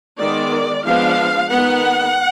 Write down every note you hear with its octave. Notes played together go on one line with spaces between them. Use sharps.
D#3 G#3 B3 D5
F3 G#3 B3 D4 F5
D#3 G#3 B3 F#5